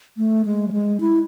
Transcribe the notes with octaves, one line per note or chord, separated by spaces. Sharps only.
A3
G#3
F#3
G#3
E4